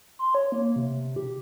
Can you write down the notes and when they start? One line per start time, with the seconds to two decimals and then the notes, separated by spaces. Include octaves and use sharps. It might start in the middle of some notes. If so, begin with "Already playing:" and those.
0.19 C6
0.35 C#5
0.52 A#3
0.76 C3
1.16 G4